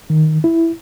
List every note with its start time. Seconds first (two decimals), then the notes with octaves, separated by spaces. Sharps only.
0.10 D#3
0.44 E4